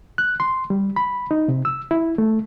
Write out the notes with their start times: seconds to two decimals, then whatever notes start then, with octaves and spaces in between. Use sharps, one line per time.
0.18 F#6
0.40 C6
0.70 G3
0.96 B5
1.31 D#4
1.48 C3
1.65 E6
1.91 E4
2.18 A3